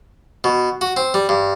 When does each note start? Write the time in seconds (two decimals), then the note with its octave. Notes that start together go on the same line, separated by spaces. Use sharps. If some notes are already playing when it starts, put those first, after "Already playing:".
0.44 B2
0.81 F#4
0.97 C4
1.14 G3
1.29 G2